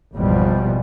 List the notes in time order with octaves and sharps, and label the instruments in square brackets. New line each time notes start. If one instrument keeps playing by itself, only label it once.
[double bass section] G#1 E2 B2 F3 G3